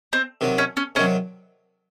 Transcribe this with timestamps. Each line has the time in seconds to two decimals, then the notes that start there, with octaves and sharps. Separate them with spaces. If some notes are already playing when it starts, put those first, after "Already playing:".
0.13 C4
0.41 C3 D#3 F#3
0.58 C#4
0.77 C#4
0.95 C3 D#3 F#3 C#4